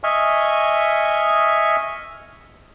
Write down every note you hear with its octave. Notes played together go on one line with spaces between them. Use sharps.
D#5 E5 G#5 C#6 F6